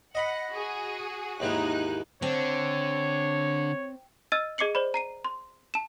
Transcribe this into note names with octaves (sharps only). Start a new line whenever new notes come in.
D#5 F#5 B5
F#4 G#4
D#2 G#2 E3 D#4 F#6
D3 C4 C#5
D#5 E6 F6 A6 D#7
G#4 D#5 D6 C7 C#7 F#7
C5 D5 B5
A#5 C7 D#7
C6
A5 E7